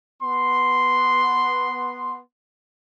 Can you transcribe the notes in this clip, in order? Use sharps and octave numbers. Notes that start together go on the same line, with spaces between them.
B3 C6